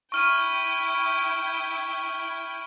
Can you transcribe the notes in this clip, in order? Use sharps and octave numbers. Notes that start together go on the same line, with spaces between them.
E4 G5 C#6 F6 D#7